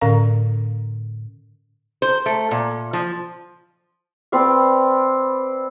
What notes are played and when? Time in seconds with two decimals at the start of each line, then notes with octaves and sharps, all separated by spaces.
0.01 A2 D3 C#4 A#4 F5 A#5
2.02 C5
2.26 A3
2.51 A#2
2.93 F3
4.32 C4 B4 D5 F5